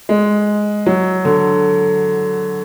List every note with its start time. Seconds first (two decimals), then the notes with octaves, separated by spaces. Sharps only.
0.09 G#3
0.86 F#3
1.25 D3